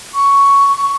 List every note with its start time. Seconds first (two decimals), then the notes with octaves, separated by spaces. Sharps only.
0.14 C#6